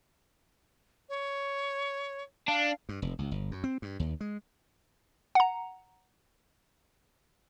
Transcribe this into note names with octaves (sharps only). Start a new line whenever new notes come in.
C#5
D4 F5
G2
F1
C#2
G1
F#2
C4
G2
D#2
G#3
F#5 A#5